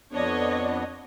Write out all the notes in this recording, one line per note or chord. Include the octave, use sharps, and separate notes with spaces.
F2 B3 D4 C#5 D#5